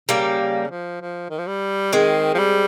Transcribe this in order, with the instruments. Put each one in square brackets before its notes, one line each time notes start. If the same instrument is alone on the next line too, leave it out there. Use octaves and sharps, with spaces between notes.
[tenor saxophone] C#3 [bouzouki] G3 A#3
[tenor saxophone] C#3
F3
F3
D#3
F3
G3
[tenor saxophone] D#3 [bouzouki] G#3 C4
[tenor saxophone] F3
G3